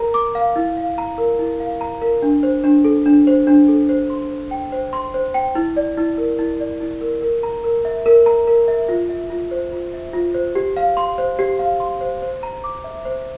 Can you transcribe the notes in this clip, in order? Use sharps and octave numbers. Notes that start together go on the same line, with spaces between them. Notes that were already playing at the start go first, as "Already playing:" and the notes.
Already playing: A#4 A#5
D6
F5
E4
F5
A#5
A#4
E4
F5
A#5
A#4
D4
C5
D4
A4
D4
C5
D4
A4
C5
C6
C5
G5
C5
C6
C5
G5
E4
D5
E4
A#4
E4
D5
E4
A#4
A#4
A#5
A#4
E5
A#4
A#5
A#4
E5
F4
E5
F4
C5
F4
E5
F4
C5
G4
F5
C6
C5
G4
F5
C6
C5
C5
A#5
D6
E5
C5